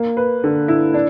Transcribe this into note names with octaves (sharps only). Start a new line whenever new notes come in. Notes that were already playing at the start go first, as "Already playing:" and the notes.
Already playing: A#3
B4
D3
E4
D4